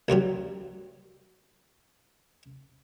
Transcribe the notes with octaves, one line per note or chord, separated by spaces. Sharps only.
C#2 G2 F#3 G3